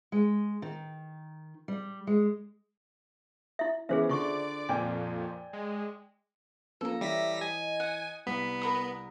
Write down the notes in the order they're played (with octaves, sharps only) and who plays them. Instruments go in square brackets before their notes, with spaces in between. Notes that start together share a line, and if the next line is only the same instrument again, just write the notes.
[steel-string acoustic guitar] G#3
D#3
G3
G#3
[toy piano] E4 E5
[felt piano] E3 B3 C#4 [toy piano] G#4 C5 E5
[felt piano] D3 [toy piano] F4 C#6 [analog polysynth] D5 D6
[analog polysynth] F2 A#2 [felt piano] D5 G5 G#5
[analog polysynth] G#3
[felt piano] F3 A#3 C#4 [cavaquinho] A4 A#5
[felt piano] E3 C#5 [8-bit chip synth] G3 A#6 B6 [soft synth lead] E5
[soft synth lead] D#5 [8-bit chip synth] G#5
[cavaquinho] F#5
[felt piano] C2 [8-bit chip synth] B3 [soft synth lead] B6
[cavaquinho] A#4 B5 D#6